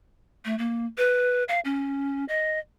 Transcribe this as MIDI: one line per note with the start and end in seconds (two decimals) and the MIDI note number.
0.45 0.57 57
0.58 0.86 58
0.98 1.43 71
1.49 1.60 77
1.65 2.25 61
2.28 2.59 75